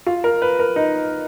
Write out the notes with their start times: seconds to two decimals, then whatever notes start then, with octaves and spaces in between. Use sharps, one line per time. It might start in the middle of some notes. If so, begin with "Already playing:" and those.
0.06 F4
0.24 A#4
0.42 B4
0.59 A#4
0.76 D#4